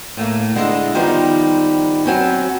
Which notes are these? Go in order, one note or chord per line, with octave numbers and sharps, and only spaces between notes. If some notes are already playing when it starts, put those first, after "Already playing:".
A2 A3 A#3
D3 G#3 E4 A4 D#5
D#3 F3 G3 B3 D#4
F#3 C4 C#4